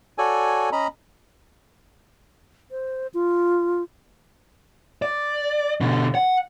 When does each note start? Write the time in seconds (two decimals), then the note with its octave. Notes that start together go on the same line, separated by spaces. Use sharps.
0.18 F#4 A4 C#5 D5 G#5
0.72 C#4 D#5 A#5 B5
2.71 C5
3.14 F4
5.02 D5
5.81 B2 D3
6.15 F#5